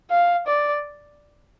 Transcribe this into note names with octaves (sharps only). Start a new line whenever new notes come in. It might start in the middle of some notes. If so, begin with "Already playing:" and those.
F5
D5